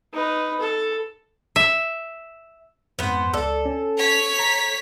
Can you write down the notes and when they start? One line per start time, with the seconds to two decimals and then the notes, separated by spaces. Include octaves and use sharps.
0.14 D#4 B4
0.60 A4
1.56 E5
2.99 F2 G#2 B3 C5
3.33 C#2 A4 D5
3.65 C#4
3.97 C#5 B6
4.39 A#5